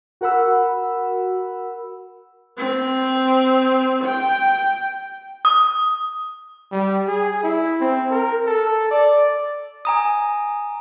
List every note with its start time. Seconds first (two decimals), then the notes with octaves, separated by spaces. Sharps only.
0.21 F#4 A#4 F#5 B5 E6
2.58 C4
4.04 G5
5.45 D#6
6.72 G3
7.07 G#4
7.43 E4
7.80 C4
8.11 A#4
8.47 A4
8.91 D5
9.85 G#5 A#5 D#6